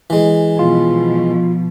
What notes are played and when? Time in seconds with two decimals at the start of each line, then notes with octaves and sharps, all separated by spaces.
0.10 E3 G#3
0.59 B2 F3 F4